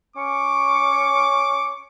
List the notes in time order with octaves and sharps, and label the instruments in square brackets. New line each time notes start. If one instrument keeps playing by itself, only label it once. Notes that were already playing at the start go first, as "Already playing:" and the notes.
[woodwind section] C#4 C#6 [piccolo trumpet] D6